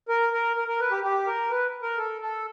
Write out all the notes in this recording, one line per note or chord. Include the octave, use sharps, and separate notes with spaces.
A#4
A#4
A#4
A#4
B4
G4
G4
A#4
B4
A#4
A4
A4